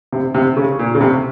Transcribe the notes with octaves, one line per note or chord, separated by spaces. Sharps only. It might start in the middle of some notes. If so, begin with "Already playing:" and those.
C3
C3
C#3
A#2
C#3
C3